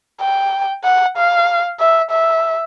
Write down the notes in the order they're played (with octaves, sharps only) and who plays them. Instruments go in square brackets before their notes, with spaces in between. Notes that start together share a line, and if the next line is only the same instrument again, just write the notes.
[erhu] G5
F#5
F5
E5
E5